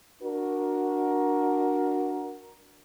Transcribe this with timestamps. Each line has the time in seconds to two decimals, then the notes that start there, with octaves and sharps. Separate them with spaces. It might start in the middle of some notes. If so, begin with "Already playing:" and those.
0.22 D4 F#4 A#4